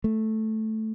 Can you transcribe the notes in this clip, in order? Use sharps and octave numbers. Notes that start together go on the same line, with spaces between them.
A3